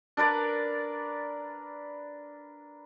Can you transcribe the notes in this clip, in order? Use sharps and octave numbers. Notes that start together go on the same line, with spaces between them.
D4 A#4 B4 D5